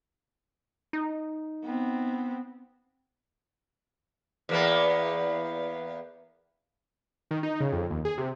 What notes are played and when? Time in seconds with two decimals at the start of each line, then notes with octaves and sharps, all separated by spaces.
0.93 D#4
1.64 B3 C4
4.49 E2 A#3 B3
7.31 D#3
7.43 D#4
7.60 C#3
7.72 F2
7.90 D#2
8.05 G#4
8.18 C3